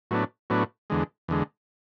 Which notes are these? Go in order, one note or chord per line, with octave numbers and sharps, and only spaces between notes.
A2 F#3 B3 D4
A2 F#3 B3 D4
E2 D3 G#3
E2 D3 G#3